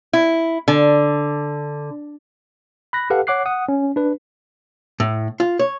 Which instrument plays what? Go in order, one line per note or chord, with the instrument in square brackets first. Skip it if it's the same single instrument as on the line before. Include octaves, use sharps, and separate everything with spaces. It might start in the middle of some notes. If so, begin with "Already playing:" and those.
[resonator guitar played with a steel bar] E4
D3
[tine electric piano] B5 F#6 A#6
G4 A4 B4 F5 F#5
C#5 F#5 D6 F#6 C7
F#5 D#6
C#4
D4 B4
[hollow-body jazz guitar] A2
F4
C#5